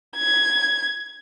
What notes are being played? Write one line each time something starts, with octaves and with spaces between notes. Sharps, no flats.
G#6